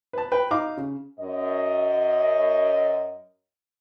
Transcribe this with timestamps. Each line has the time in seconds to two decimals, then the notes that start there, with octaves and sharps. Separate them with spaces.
0.13 B4 A5
0.32 B4 G5
0.51 D#4 F5 A#5 D6
0.77 C#3
1.20 F#2 D#5